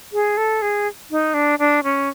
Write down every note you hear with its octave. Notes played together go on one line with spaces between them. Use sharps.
G#4
A4
G#4
D#4
D4
D4
C#4